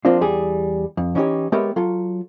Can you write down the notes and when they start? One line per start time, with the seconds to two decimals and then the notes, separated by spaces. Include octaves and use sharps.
0.05 F3 A#3 C4 D4 F4
0.21 E2 G3 G#4
0.97 F2
1.15 E3 C#4 D#4 F4 G4 C#5
1.52 G#3 B3 G4 A#4 C#5 E5
1.76 F#3 F4 A4